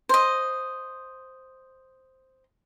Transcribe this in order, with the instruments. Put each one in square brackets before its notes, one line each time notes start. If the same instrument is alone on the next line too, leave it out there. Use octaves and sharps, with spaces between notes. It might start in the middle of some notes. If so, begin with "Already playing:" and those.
[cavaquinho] C5 D#5